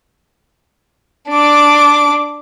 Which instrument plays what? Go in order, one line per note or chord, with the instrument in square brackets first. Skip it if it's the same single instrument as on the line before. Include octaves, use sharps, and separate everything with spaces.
[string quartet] D4 D6